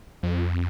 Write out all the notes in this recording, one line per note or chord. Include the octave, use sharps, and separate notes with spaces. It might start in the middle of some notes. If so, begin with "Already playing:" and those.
F2